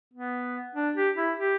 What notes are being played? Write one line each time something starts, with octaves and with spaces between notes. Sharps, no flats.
B3
D4
G4
E4
G4